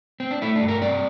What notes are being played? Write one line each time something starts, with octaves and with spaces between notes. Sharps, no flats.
C4
D4
A3 E4
D4
G2
A#4
C4 D5